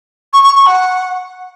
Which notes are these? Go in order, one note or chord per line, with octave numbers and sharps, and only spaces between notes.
C#6
C#6
C#6
F#5